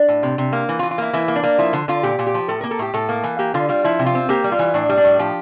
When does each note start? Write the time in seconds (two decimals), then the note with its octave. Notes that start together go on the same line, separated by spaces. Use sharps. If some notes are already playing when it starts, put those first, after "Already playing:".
Already playing: D4
0.08 A2
0.23 C3
0.38 C3
0.53 A#3
0.69 E3
0.79 F4
0.83 E3
0.91 F4
0.98 A#3 E4
1.13 E3 E4
1.28 A#3
1.36 D4
1.43 A#3
1.58 F3 E4
1.73 D3
1.88 D3 F4
2.03 A#2 G4
2.19 A#2
2.27 G4
2.34 F3
2.48 A2 A4
2.61 A#3 A#4
2.71 A4
2.79 A2 G4
2.94 A2 A4
3.09 A#3
3.23 E3
3.39 A#3 G4
3.54 D3 F4
3.69 G3 F4
3.84 F3 E4
3.99 C3
4.06 F4
4.15 C4
4.29 A#3 G4
4.44 G3
4.52 F4
4.59 E3
4.74 A2 D4
4.89 G3
4.97 D4
5.04 A2
5.19 F3 G4